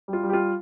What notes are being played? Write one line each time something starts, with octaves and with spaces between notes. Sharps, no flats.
G3
F4
G3
G4
F4